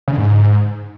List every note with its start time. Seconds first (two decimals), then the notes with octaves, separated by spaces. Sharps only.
0.08 C#3
0.13 D3
0.18 G#2